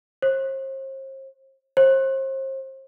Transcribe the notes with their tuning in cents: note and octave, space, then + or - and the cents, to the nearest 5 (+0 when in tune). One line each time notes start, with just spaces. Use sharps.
C5 +40
C5 +35